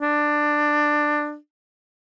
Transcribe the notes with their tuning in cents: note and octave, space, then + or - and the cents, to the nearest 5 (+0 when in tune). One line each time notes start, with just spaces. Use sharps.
D4 +15